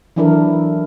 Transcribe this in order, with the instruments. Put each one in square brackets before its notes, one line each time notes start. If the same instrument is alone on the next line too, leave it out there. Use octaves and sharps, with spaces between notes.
[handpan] E3 F#3 D4 E4 A4 A#4